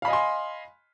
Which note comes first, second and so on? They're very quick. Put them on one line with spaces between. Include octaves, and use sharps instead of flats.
F5 B5 D#5 G#5 C6